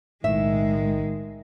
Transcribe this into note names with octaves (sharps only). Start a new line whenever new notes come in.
B1 A2 D#3 G#3 E5